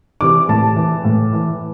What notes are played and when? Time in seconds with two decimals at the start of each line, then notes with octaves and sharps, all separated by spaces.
0.21 C3 E3 D6
0.49 A2 A5
0.76 E3
1.05 A2
1.33 E3